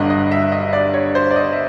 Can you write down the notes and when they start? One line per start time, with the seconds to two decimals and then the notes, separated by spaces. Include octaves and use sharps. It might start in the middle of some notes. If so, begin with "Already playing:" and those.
Already playing: G1 G2 D3 G3 D#5
0.10 D#5
0.31 E5
0.52 D#5
0.73 D5
0.94 C#5
1.15 C5
1.31 D5
1.36 D#5
1.53 E5